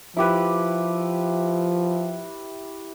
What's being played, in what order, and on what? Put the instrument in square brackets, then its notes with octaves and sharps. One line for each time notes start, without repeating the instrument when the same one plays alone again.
[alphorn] F3 [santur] E4 G4 B4